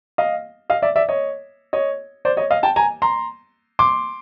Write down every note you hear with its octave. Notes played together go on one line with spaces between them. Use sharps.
D#5 F5
D#5 F5
D5 E5
D5 E5
C#5 D#5
C#5 D#5
C5 D5
C#5 D#5
D#5 F5
G5 A5
G#5 A#5
A#5 C6
C6 D6